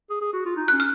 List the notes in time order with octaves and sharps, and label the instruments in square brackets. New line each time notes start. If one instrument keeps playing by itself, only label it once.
[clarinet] G#4
G#4
F#4
F4
D#4
[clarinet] C#4 [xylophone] F#6
[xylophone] F6